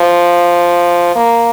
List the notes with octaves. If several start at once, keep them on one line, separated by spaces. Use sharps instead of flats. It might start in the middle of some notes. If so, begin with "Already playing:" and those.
Already playing: F3
A#3